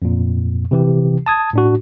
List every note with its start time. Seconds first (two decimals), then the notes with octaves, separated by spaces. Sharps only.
0.02 F2 A#2
0.71 C3 E3 G4
1.26 A5 D#6 G#6
1.53 A2 D4 F#4